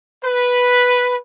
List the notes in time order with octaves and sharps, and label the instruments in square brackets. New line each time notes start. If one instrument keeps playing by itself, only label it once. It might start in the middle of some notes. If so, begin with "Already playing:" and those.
[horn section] B4